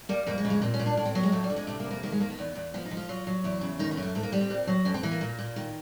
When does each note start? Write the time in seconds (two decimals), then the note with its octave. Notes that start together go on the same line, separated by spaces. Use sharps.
0.09 G3 A#3
0.27 F2 A#3
0.38 G#3
0.45 C#3
0.50 G#3
0.61 A#2 C4
0.74 C#4
0.79 A#2
0.86 D4
0.97 A2 D4
1.05 C4
1.15 F#3 B3
1.23 G#3
1.32 F2 A3
1.44 G3
1.50 D3
1.56 G#3
1.67 C3 A3
1.80 A#3
1.85 F2
1.91 A#3
2.03 D#3 A#3
2.12 G#3
2.20 D#3 A#3
2.30 B3
2.39 E2
2.55 E2
2.74 F3 B3
2.85 D#4
2.91 F3
2.97 F4
3.09 F#3
3.27 F#3
3.44 E2 E4
3.61 C#3
3.79 D#3 D#4
3.91 B3
3.97 F#2
4.03 A3
4.15 G#2 A3
4.23 A#3
4.32 G3 B3
4.41 C4
4.50 A#2
4.67 F#3
4.85 F2 C#4
4.94 C4
5.03 E3 B3
5.11 A#3
5.21 A#2
5.39 A#2
5.56 D#3